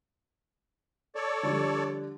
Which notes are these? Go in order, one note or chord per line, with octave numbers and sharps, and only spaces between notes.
A4 C#5 D5
D3 F3 G3